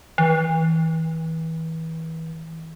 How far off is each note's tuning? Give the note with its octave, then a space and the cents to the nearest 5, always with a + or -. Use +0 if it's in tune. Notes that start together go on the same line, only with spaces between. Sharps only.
E3 -30